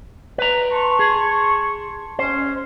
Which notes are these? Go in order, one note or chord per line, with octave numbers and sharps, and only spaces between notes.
B4 A#5
A5 C6 C#6
G#4
C#4 C5